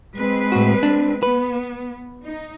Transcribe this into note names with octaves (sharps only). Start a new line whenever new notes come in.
G#3 C4 B4
A2 F#4
D4
B3 B4
D#4